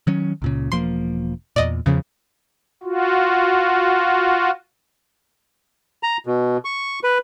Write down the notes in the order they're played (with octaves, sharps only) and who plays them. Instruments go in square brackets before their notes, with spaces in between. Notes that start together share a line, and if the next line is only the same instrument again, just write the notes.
[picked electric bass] D#3 F#3 C#4
C#2 A#2 C#3
[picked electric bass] E1 F3 A#3 [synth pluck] C6
[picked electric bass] E2 A#2 [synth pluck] D5 D#5
[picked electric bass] E2 F3 [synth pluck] C#3
[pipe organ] F4 F#4
[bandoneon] A#5
B2
C#6
B4